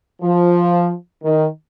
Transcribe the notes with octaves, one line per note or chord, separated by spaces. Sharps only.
F3
D#3